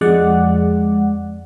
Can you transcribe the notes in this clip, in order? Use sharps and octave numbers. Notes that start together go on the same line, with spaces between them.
F2 G#3 D5 F#5